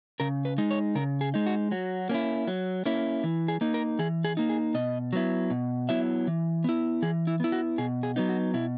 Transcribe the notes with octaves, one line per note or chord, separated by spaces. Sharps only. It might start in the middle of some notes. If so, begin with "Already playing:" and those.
C#3 A#4
B4
G#3 D#4
C#5
C#3 A#4
G#4
G#3 D#4
F#4
F#3 F#4
A#3 C#4 E4
F#3
A#3 C#4 E4
E3
G#4
A#3 D#4
A#4
E3 G#4
G#4
A#3 D#4
G#4
B2 D#5
F#3 B3 E4
B2
F#3 B3 E4 E5
E3
B3 E4
E3 G#4
E4
B3 E4
F#4
B2 G#4
G#4
F#3 B3 D#4
F#4
B2 E4